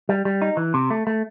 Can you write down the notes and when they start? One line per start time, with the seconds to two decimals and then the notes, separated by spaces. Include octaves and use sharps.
0.09 G3
0.25 G3
0.42 D#4
0.57 E3
0.74 C3
0.90 A3
1.07 A3